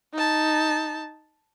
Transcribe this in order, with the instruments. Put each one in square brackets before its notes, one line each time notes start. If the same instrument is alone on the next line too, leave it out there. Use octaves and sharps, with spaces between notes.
[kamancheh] D#4 A5